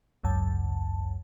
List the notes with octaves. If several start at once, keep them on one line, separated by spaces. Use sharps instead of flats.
G#1 C#2 F#2 A5